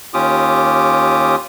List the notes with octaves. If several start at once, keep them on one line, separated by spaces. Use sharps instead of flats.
D#2 C#4 F4 G4 D6 D#6